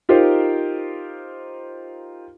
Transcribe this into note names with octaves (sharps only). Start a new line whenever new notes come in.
D#4 F4 G4 A#4 C5